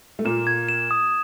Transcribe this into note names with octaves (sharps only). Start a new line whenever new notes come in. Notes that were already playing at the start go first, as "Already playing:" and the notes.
A3
A#2 A#3 E7
G#6
E7
D#6